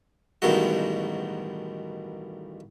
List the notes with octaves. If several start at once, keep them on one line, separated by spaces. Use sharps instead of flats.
A1 G2 B2 D#3 G#3 F#4